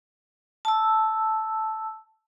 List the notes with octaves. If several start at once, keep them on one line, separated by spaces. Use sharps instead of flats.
A5 E6